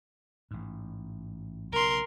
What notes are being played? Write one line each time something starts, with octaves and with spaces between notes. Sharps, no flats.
A1 G#2
B1 C#3 A#4 C6